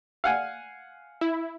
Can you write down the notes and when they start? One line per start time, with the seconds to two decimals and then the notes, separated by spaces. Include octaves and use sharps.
0.24 F5 F#5 G#5
1.21 E4